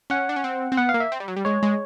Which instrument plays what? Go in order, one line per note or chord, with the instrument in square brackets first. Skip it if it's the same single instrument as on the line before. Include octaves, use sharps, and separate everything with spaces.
[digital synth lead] C#4 [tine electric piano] F#5
[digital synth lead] D4
C#4
C4
C4
[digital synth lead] B3 [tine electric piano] F#5
[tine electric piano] F5
[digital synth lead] A#3
[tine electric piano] E5
[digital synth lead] C4
G3
F#3
G3
[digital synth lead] G#3 [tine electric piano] C#5
[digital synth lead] G#3